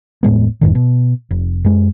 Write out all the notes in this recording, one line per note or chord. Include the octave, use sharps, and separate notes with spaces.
E1 A2 G#3 B3
F1 E2 G#2 D#3
B2
F1
F#2 G#3